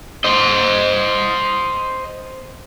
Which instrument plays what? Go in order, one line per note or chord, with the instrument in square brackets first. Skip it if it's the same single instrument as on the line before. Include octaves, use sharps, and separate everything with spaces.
[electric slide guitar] C5 D#5